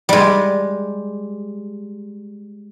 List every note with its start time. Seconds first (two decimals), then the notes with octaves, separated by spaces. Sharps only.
0.09 G3 G#3